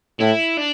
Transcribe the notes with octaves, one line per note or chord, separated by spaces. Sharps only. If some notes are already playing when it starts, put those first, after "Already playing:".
A2 E4
D4